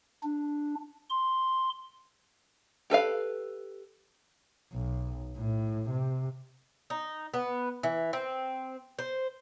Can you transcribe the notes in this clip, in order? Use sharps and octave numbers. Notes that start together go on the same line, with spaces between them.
D4
C6
G4 A4 B4 F5
B1
A2
C3
D#4
B3
E3
C4
C5